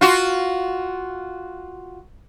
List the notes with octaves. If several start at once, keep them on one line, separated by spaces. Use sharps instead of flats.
F4 F#4